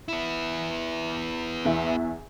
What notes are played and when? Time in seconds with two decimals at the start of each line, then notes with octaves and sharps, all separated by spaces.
0.08 B3 E4
1.65 E2 E5